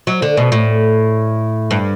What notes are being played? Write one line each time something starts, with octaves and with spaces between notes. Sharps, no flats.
F#3
D3
B2
A2
G2